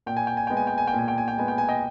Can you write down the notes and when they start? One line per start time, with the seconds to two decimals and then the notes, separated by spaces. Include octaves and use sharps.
0.06 A#2 G5
0.17 G#5
0.27 G5
0.37 G#5
0.47 G#3 B3 G5
0.57 G#5
0.67 G5
0.78 G#5
0.87 G5
0.93 A#2
0.98 G#5
1.08 G5
1.18 G#5
1.28 G5
1.37 G#3 B3 G#5
1.48 G5
1.58 G#5
1.68 D#5 G5